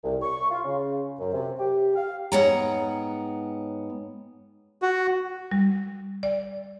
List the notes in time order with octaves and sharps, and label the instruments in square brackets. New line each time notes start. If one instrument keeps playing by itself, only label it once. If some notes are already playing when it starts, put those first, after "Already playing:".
[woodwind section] C2
C#6
F4
C#3
F#2
C3
G4
F5
[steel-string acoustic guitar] G#2 B3 C#5 F#5 G5 A#5
[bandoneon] F#4
[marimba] G3
D5